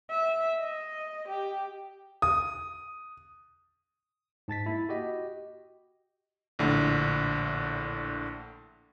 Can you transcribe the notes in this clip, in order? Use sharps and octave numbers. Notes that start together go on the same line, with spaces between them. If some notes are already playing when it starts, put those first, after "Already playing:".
E5
D#5
G4
D#6
G#2 A5 A6 B6
A#3 E4
F#4 G4 D#5
A#1 A2 D3